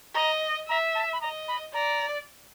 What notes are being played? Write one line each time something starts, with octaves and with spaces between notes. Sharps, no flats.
D#5 A#5
E5 A#5
A5
B5
D#5 A#5
B5
D5 A#5